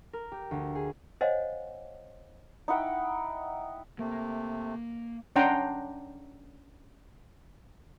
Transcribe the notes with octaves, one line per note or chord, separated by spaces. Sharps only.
A#4
G4
D2
G#4
C5 C#5 D#5 F5 F#5 G#5
D#4 E4 F#5 G5
C3 A3 A#3
C#4 D4 F#5 G5 A#5 C6